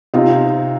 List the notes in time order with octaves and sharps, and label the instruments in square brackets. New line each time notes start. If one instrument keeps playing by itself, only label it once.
[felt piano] C3 D#4 F4